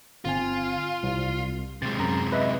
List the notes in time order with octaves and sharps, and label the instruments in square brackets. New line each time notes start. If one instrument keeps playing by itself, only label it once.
[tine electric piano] G1 C4 G#5 [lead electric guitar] F4
[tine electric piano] C2
[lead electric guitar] C3 G#3 [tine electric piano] A6
[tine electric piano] F#2 A#5
B4 D#5 E5